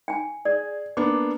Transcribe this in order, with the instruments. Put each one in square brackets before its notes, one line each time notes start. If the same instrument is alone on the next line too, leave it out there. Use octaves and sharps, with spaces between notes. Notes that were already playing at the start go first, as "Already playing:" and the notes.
[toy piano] G5 G#5
[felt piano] G#4 [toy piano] D5
[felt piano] A#3 B3 D4 [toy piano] D6